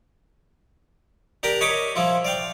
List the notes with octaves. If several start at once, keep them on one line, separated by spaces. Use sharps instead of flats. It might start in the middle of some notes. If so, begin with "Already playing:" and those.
D4 G4 A#4 G5 A#5
C#5 D#5 B5 D6 D#6
F3 E4 F4
D5 F5 G5